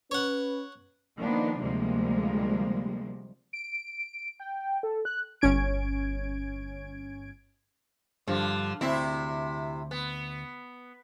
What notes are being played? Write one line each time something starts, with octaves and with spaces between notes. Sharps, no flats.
C#4 B4 C#5 F#5
D#3 F3 A#3 B3 D4
D2 C3 F3 G3 G#3 A#3
D7
G5
A4
F#6
G1 C#4 G#6 D7
G2 D3 F3
D2 C3 C4 E4
B3